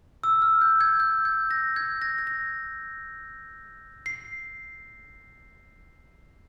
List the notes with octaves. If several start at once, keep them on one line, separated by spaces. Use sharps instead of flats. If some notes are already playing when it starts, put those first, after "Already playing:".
E6
F6
G6
G#6
G6
G#6
A#6
G#6
A#6
G#6
A#6
C7